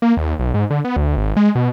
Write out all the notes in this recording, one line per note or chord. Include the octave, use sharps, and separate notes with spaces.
A#3
D#2
B1
G#2
D3
B3
D2
G#1
G#3
B2